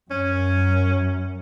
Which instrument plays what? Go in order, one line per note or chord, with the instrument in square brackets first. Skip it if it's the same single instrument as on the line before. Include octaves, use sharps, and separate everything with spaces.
[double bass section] F#2 [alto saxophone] C#4